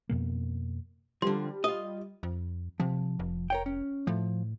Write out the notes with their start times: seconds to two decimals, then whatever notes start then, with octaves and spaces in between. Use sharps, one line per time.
0.09 F2 B2 A#3
1.22 D3 F3 G3 C6
1.64 F4 D#5 D#6
2.23 F2
2.80 C3 F3
3.19 F1
3.50 A#4 C#5 G5
3.66 C#4
4.07 A2 F3